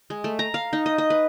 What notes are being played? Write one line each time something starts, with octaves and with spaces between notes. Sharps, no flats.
G#3
A3
A#5
F5
D#4
D#5
D#5
B4